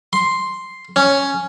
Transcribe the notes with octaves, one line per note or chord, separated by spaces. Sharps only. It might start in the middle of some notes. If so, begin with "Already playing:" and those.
C6
C#4